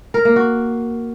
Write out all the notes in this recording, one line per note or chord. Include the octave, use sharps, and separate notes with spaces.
A#4
A#3
F#4